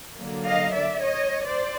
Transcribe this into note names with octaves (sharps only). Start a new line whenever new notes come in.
D3 F#3 A#3
D#5 F5
D5 E5
C#5 D#5
C5 D5